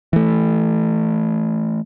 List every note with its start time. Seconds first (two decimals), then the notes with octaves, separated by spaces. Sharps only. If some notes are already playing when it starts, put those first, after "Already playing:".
0.13 E3 A3